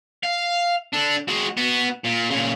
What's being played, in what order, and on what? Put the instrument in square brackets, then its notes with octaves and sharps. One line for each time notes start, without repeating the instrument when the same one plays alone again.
[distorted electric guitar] F5
D4 A4
G#3 F#4
B3 F#4
A#2
A#2 C#3